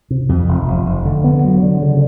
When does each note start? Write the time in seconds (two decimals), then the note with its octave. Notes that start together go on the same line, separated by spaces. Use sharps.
0.10 C3
0.29 F2
0.48 F1
0.67 F1
0.86 F1
1.05 D3
1.24 B3
1.44 F#3
1.63 D3
1.82 C#3